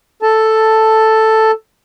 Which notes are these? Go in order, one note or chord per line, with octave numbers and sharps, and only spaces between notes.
A4 A5